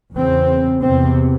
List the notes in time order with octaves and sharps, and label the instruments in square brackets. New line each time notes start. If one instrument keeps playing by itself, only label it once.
[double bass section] E2 C#3 C4
E2 C3 C4